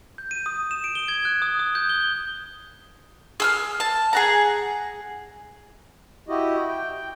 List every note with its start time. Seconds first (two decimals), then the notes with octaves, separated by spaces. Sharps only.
0.18 G6
0.31 D#7
0.46 D#6
0.71 E7
0.84 D7
0.95 G7
1.08 G#6
1.25 F#6
1.42 D#6
1.59 D#6
1.75 G6
1.89 G7
3.40 G#4 E6 F6
3.80 A5
4.13 G#4 F#5 A#5
6.29 E4 F#4 G4 D#5
6.68 G5